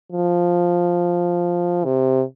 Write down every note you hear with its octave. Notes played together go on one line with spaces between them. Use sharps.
F3
C3